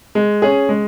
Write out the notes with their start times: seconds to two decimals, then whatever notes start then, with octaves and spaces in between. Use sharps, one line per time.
0.15 G#3
0.42 C#4 G#4
0.69 G#3